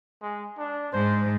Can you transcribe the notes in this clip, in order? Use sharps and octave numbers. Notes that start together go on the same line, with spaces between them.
G#3
D4
G#2 C5